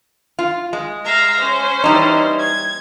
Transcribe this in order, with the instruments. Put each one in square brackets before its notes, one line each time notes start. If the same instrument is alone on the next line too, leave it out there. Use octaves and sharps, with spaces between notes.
[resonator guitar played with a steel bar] F4
G#3
[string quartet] E5 F5 A#5
C#4 C5
[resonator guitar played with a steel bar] E3 G3 D#4
[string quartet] G#6